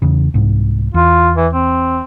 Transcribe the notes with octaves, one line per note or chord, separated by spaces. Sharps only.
E2 C#3
C2 G#2
E2 F4
E3
C4